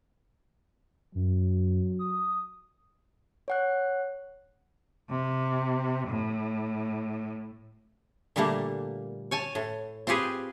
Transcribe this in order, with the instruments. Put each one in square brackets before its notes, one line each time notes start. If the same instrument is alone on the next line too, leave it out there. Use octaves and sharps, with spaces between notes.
[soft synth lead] F#2 [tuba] F#3
[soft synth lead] D#6
[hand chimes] C#5 F#5 F#6
[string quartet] C3
A2
[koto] A#2 D3 G3 A3 A#3
C#5 G#5 A5
A2
C4 F4 G4 G#4 B4